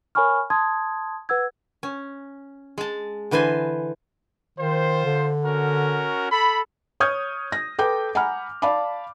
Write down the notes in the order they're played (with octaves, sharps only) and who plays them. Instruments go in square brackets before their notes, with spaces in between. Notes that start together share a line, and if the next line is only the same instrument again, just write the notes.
[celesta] A#4 C#5 G#5 B5 C#6 F6
A5 C6 D#6 G#6
B4 F#5 E6 G#6
[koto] C#4
G#3 A5
D3 E3 B4 C5 G#5
[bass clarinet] D#3 [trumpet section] F4 C5
[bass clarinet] D3
[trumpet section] C#4 F#4 A#4
A4 B5
[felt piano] C#5 C#6 D#6 F6 G6 G#6
A#6
A4 B4 G5 D6 G6
F#5 G#5 A#5 B5 F6
D5 F5 A5 B5 D6